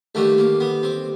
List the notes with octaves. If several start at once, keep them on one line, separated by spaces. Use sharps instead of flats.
D#2 D3 G3 A3
A#3
B3
C4